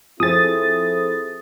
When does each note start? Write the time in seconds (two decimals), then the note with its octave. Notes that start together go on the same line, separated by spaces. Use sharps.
0.20 F3 C4 E4 G#4 A4 C5 D#6 A6